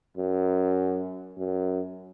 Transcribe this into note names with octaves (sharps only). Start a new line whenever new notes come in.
F#2
F#2